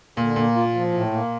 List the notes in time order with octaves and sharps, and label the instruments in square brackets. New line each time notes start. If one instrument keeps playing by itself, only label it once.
[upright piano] A#2 [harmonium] D3
[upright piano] A#2 [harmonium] A#3
[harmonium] F4
F3
A2
A#3